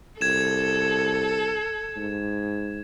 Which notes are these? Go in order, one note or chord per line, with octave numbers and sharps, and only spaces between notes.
C2 A4 G#6 E7
G#2